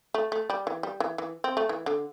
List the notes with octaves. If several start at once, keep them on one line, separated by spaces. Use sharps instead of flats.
A3
A3
G3
E3
G3
E3
E3
C4
A3
E3
D3